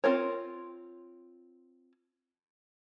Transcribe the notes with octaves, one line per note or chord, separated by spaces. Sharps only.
C4 F4 A#4 C#5